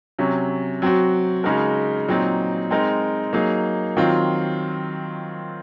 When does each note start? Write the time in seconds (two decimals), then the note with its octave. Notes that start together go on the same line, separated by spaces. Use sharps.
0.19 C3 F#3 C#4
0.82 F#3 C4 F#4
1.44 C#3 G#3 D#4 F#4 A#4
2.08 A#2 F#3 C4 D#4
2.70 G#3 C4 D#4 A#4
3.33 F#3 A#3 D#4 G#4
3.97 D#3 F#3 C4 F4